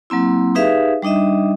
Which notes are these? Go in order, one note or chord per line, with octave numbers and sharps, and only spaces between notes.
F#3 A#3 C4 E4
D#4 G4 G#4 B4 E5 F5
G3 D4 D#4 D#5 E5